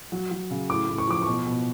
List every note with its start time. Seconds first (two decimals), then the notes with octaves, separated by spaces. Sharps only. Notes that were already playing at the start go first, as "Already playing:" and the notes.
0.12 F#3
0.31 F#3
0.51 C#3
0.69 A2 D6
0.89 A2
0.98 C#6
1.07 F3 D6
1.22 B2 C#6
1.47 B2